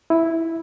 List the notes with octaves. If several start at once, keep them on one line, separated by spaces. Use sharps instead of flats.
E4